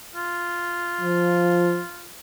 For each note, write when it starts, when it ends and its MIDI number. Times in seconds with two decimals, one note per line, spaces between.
0.16 2.12 65
1.01 1.81 53